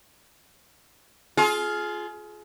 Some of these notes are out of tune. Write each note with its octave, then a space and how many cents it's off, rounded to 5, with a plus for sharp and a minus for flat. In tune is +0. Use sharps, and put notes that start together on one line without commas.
F4 +0 G#4 +30